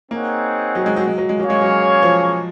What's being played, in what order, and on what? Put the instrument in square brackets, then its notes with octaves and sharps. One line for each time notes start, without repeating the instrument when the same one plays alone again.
[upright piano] A#3 [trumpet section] C4 D#4 G#4 C#5 F#5
[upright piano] F#3
G#3
F#3
G#3
F#3
G#3
[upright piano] F#3 [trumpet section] A#3 C#4 G#4 C#5 F5
[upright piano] G#3
F#3
F3